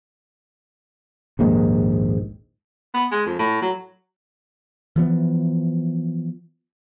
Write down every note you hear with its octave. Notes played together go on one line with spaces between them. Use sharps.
A#1 D#2 G#2 D#3
B3
G#3
F2
A2
F#3
E3 F3 B3